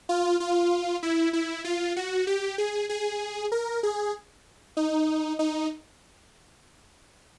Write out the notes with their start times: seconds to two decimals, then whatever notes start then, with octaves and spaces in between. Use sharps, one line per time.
0.09 F4
0.40 F4
1.03 E4
1.33 E4
1.64 F4
1.96 F#4
2.27 G4
2.58 G#4
2.89 G#4
3.52 A#4
3.83 G#4
4.77 D#4
5.39 D#4